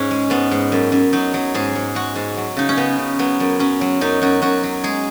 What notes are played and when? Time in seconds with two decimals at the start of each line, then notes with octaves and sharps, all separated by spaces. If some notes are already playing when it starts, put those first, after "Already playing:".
Already playing: G#2 C#4
0.11 G#3
0.30 G#2 B3
0.51 G#2
0.72 F#2
0.92 F#2
1.13 F#3 D#4
1.34 F#3
1.54 G#2 G#4
1.75 G#2
1.95 G#3 F#4
2.15 G#2
2.37 F#3
2.57 C#3 D#4
2.69 C#4
2.77 C#3 B3
2.98 C#3
3.19 F#3 B3
3.40 F#2
3.59 F#3 C#4
3.81 F#3
4.01 F#2 D#4
4.22 F#2 F#4
4.42 F#2 F#4
4.63 F#3
4.84 G#3 G#4